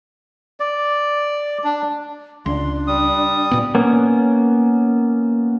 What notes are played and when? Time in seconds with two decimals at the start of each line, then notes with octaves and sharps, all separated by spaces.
0.60 D5
1.64 D4
2.46 C#2 D4 C6
2.87 G3 D#6
3.51 A#2 B3
3.75 A#3 B3 C#4